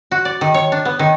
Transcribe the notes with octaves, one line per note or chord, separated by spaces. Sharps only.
F#4
D5
D#3
C#5
D4
B3
D#3